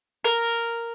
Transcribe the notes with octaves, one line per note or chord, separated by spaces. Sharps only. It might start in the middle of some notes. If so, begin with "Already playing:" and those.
A#4